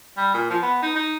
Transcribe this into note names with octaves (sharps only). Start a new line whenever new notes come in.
G3
A#2
F3
B3
D#4
D#4